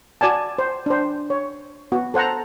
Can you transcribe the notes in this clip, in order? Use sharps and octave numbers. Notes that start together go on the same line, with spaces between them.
F#4 D5 G#5 A5
C5
D4 C5
C#5
B3 F#4
A4 C5 F#5 A5 A#5